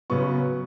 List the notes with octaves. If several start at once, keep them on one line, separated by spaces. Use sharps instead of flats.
F#2 C#3 F#3 B3 C#6